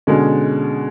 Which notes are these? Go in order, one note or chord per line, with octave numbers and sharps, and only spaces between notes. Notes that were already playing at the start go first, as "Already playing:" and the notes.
B2 D3 G#3 C#4